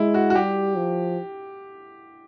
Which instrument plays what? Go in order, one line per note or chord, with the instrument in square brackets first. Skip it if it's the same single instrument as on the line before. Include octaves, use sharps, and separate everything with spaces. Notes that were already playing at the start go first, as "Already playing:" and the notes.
Already playing: [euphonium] G#3 [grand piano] E4
[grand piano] F#4
F#4
[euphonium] G3 [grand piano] G4
[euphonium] F3